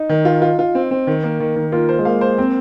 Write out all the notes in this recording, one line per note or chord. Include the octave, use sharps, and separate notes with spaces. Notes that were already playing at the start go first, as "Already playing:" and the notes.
Already playing: D#4
D#3
F4
F4
F4
C4
C4
D#3
A#3
D#3
D#3
A#3 F4
C5
G#3
A#3 F5
C5
A#3 C4